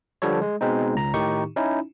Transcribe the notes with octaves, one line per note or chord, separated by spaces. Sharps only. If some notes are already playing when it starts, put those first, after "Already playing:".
D3 F3 G3 A4 C#5
G#3
B2 G#3 C4 D#4
C#2 A#5
A2 D#3 D#4 G4 C#6
C#4 D#4 E4